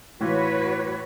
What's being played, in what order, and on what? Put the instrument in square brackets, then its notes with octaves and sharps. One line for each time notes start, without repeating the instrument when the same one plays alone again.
[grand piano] A2 E3 F4 [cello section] F#4 B4 C#5